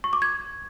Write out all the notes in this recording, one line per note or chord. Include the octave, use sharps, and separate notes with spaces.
C#6
D6
G#6